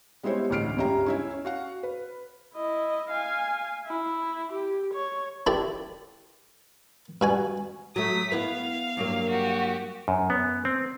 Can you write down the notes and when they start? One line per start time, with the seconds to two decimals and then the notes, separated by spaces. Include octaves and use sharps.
0.23 G3 G#3 B3 E4 C5 C#5
0.50 A1 D2 E4 F6 C7 D7
0.77 C#2 G2 C#4 G4 E5 A#5
1.06 C#4 E4 E5
1.45 F#4 F5 F#5
1.83 B4
2.55 E4 D#5
3.10 F5 G#5
3.86 E4
4.53 G4
4.95 C#5
5.47 D4 E4 G4 A4 D5
7.21 G2 F#4 G#5
7.96 F#3 A3 D#6 B6
8.32 B3 E4 B4 F5
8.97 G2 F#3 A#3
9.30 F#4 G4
10.08 F#2
10.30 B3
10.65 C4